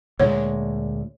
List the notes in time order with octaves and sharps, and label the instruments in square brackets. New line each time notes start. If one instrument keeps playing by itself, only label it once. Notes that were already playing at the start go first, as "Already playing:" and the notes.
[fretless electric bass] D2 A#2 G#3 [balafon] C#5